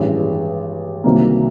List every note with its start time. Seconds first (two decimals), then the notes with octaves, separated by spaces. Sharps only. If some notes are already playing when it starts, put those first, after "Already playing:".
Already playing: A1 G2 E3 G#3
1.04 C2 C3 D#3 F#3 A#3